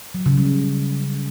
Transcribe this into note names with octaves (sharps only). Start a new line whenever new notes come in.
F#3
C#3
G3